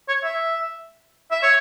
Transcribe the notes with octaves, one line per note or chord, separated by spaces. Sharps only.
C#5
E5
E5
C#5